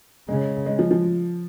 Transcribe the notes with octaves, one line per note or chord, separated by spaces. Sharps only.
C#3 G#3
G#3
F3
F3